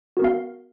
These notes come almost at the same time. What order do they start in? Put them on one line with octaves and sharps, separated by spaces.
F#4 A#4 B3 F5